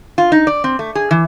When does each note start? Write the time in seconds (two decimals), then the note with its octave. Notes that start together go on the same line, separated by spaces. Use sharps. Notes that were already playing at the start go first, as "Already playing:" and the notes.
0.18 F4
0.32 D#4
0.47 D5
0.64 C4
0.79 A3
0.95 G#4
1.11 E3